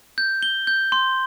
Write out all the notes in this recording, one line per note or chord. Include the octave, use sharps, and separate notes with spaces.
G6
G7
G6
C6